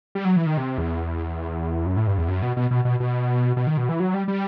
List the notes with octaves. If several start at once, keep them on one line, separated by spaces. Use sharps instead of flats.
G3
F#3
E3
D#3
C3
E2
F#2
A2
G2
E2
F#2
B2
B2
B2
B2
B2
B2
D#3
B2
E3
F#3
G3
G3